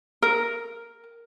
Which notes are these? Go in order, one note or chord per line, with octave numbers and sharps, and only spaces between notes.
A#4